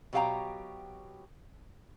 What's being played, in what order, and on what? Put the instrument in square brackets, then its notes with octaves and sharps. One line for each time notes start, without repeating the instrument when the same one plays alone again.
[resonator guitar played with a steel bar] B2 F#3 G4 F5 G5 A#5